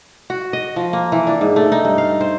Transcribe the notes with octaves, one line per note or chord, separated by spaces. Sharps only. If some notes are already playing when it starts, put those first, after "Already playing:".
F#4
D#5
F3
A#3
E3
D4
G#2
A3
D#4
G2
F5
C5